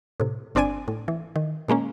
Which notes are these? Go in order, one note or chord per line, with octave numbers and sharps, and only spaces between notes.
A2 C3
G1 C4 D4 D5 G#5 D#7
A2
E3
D#3
A#2 G#3 A#3 C#4